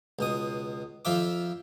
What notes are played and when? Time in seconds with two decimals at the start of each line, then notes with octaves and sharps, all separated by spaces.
0.19 C#2 B2 D#6
1.05 F2 F3 F4 E5 D6